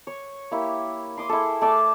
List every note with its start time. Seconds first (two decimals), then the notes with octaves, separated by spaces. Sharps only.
0.07 C#5
0.51 A#3 E4 G4
1.17 C6 D6 D#6
1.29 E4 G#4 A4
1.61 A3 A4 D5 A5